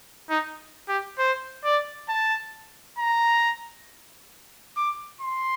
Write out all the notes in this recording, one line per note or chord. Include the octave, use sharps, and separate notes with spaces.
D#4
G4
C5
D5
A5
A#5
D6
C6